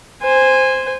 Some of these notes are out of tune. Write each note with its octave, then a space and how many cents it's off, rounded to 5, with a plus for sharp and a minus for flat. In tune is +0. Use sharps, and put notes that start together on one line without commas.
C5 -5 G#5 -15